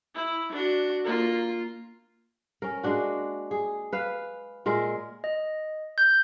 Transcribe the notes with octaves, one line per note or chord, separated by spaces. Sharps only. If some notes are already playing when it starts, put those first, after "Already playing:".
E4
D4 F#4
A#3 F4
C#4 A#4
G#3 A#3 D4 F#4
G#4
B4 F5
A#2 G#3 A#4 E5
D#5
G6